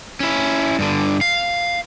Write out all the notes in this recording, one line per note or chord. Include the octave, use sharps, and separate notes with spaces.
C#4 E4
G2 D3
F5